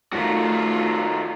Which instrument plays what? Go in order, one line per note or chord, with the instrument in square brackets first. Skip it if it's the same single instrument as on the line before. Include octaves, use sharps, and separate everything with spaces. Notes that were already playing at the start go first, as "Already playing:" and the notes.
[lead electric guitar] D#3 F#4 [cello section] A3 F4